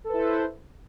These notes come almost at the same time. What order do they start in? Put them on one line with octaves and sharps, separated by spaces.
A4 B4 E4 C5